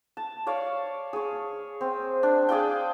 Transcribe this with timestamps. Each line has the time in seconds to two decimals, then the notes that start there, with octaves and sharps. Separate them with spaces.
0.17 A5
0.47 C#5 D5 F5
1.13 G#4 C#5
1.81 C4
2.23 D4
2.49 G#4 D5 F5 G5